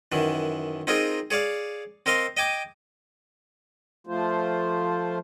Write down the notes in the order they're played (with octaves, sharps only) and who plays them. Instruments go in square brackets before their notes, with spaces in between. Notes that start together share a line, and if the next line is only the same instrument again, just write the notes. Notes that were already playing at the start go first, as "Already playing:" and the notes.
[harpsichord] F#2 D#3 E3
C4 D#4 F4 G#4 A#4 D#5
G#4 C#5 D5 F5
C4 A#4 D#5 F5 C6
D#5 G5 G#5 D6
[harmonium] F3 A3 F4 C5